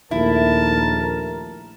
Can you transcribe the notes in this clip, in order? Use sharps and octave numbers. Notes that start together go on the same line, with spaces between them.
A#1 D#2 A3 E4 A#4 A5